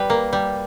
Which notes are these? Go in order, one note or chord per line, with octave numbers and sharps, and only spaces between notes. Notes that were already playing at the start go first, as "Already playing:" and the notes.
Already playing: G3 B4
A#3
G3